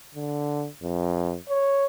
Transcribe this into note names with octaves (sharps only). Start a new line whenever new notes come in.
D3
F2
C#5